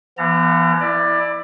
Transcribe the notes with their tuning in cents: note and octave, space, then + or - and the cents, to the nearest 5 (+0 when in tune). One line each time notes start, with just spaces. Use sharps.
E3 +45 B3 -15 A#5 -35
E4 +0 D5 +20